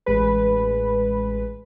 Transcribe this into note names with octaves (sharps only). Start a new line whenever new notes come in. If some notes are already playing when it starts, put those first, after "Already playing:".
A1 G#3 B4